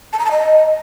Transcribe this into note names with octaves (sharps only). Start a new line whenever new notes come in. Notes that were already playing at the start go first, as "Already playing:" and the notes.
A5
A#5
A5
D#5